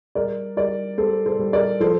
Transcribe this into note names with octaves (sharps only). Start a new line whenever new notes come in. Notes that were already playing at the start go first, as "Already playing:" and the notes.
G3 A#4 D5
G3 A#4 D5
G3 A4 C5
A4 C5
G3
A#4 D5
F3 A4 C5